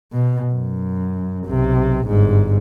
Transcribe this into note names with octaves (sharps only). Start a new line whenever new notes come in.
B2
F#2
B1 C3
G1 G#2